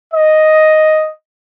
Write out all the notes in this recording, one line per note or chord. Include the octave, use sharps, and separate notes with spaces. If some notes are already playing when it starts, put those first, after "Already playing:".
D#5